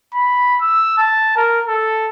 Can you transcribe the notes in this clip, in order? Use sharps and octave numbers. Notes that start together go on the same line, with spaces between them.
B5
E6
A5
A#4
A4